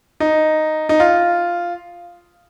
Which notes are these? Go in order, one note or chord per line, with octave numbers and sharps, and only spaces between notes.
D#4
D#4
F4